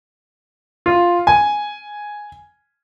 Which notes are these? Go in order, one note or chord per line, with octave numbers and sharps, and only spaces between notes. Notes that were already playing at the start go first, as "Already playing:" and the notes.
F4
G#5